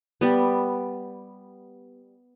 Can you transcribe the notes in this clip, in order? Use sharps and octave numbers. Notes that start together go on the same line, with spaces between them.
G3 B3